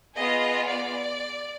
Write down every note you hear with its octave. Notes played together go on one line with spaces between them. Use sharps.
B3 F4 G#4 D#5
D5